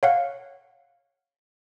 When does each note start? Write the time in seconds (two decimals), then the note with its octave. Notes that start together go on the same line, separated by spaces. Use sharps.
0.03 C#5 F5 F#5